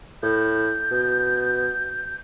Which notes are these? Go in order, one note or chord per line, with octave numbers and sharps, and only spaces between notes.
A2 G6
B2